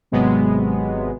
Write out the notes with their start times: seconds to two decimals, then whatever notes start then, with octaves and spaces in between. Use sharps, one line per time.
0.12 G#1 C3 F#3 G#3 B3